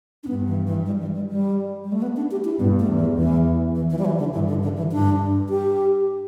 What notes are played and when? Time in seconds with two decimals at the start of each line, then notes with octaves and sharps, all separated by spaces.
0.24 D4
0.28 G2 B3
0.47 E3
0.67 E3
0.86 G3
1.01 E3
1.15 G3
1.30 G3
1.84 G3
1.92 A3
2.02 B3
2.16 D4
2.31 G4
2.44 E4
2.59 G2 B3
2.79 A3
2.88 E2
2.98 E3
3.17 E2 E3
3.75 E3
3.90 E3
3.99 G3
4.05 E3
4.19 D3
4.34 G2 E3
4.48 D3
4.63 D3
4.77 E3
4.92 G2 D4
5.49 G4